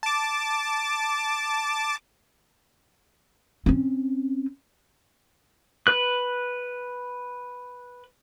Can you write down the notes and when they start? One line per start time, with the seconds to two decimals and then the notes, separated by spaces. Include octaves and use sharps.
0.03 A5 D6
3.66 C4 C#4
5.87 B4 F#6